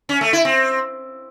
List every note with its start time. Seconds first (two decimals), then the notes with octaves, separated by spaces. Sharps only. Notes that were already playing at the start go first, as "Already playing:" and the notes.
0.09 C#4
0.21 A3
0.33 E4
0.45 C4